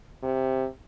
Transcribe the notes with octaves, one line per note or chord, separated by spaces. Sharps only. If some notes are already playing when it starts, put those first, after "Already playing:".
C3